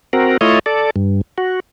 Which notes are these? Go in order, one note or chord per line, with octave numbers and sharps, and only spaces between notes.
C4 F#4 A#4
A3 E4 F4 C#5 D#5
A4 D5
G2
F#4